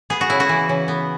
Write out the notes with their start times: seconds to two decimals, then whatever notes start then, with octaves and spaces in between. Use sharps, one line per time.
0.10 B3 G#4
0.21 F#4
0.30 C#3 E4
0.40 F#4
0.49 E3
0.69 C#3
0.88 B3